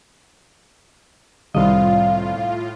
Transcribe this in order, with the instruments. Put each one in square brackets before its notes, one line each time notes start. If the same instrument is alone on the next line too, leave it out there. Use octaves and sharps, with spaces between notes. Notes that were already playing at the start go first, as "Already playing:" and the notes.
[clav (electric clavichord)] C2 D#5 [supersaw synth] A2 F4 [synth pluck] D#3 G3 [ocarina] F5